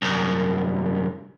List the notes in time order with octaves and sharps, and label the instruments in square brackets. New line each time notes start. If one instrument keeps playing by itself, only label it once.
[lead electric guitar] C2 F#2